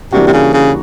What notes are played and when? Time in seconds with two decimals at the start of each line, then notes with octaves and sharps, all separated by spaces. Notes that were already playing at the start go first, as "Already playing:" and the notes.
0.12 C3 E3 G3 A#3 D4 F#4
0.27 C3
0.33 C#3
0.54 C#3